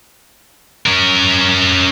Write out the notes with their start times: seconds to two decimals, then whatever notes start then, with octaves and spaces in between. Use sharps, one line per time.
0.86 C#4 A#4